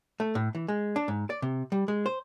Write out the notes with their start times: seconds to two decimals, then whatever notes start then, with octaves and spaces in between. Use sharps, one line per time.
0.20 A3
0.35 A2
0.55 E3
0.68 G#3
0.96 D4
1.08 G#2
1.30 D5
1.42 C3
1.72 G3
1.88 G#3
2.06 C5